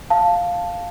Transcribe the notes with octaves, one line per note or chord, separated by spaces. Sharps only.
F5 A5